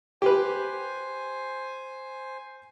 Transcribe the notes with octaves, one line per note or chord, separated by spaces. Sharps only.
G4 B4 C5 G#5